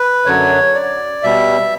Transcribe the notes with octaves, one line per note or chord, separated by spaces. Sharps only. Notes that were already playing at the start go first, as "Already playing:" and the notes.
Already playing: B4
F#2 D3 F#3 C#5
D5
B2 G3 E5